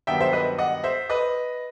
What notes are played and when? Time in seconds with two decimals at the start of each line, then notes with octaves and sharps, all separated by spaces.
0.07 G2 D#3 F#3 B3 E5 G5
0.21 C5 E5
0.33 B4 D#5
0.58 D#5 F#5
0.84 C5 E5
1.10 B4 D#5